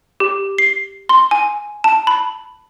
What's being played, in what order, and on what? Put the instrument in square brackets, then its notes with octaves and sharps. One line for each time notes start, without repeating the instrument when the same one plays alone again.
[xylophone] G4
C7
C6
G#5
A5
B5